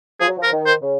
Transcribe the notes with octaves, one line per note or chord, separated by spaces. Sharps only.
F3 G#4
F#3
F3
A#4
D#3
C5
C#3